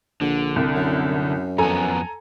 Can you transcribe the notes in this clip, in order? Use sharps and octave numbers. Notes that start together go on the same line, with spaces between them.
A#1 D3
C2
F#2
F2 B3 A4 G#5 A#5